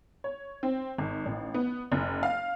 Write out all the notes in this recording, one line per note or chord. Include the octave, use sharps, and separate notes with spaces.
C#5
C4
G#1
A1
B3
F#1
F5